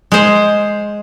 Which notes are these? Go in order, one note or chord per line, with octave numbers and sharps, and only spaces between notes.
G#3 C5